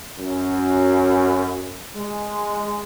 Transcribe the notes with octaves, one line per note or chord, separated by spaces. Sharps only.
F#2
G#3